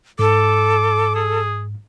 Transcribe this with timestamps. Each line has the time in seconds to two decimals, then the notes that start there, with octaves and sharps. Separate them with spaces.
0.19 G#2 A4 D6
1.15 G#4